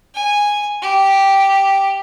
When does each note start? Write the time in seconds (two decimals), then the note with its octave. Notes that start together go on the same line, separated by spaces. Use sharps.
0.15 G#5
0.82 G4